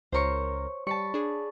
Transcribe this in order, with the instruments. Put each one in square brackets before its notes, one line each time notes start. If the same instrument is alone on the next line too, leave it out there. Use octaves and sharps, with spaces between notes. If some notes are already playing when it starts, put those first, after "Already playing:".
[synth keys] C#2 A#4 [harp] C5 C#5 C#6
[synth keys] G3 [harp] A5 B5 C#6
[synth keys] D4 G#4